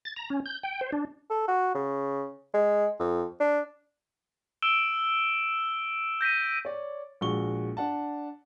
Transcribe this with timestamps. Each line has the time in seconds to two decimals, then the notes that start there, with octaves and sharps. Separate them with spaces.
0.05 A6
0.16 A#5
0.30 C#4
0.46 G6
0.63 G5
0.81 C5
0.92 D4
1.30 A4
1.48 F#4
1.75 C#3
2.54 G#3
3.00 F2
3.40 D4
4.62 E6 D7 E7 G7
6.21 G6 A#6 B6 D#7
6.65 C#5 D5
7.21 A#1 G#3 F#4 C#6 G7
7.77 D4 F#5 A5